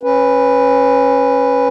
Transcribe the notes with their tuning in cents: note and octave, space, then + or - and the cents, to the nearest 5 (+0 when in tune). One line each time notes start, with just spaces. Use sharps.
C#4 -20 B4 +0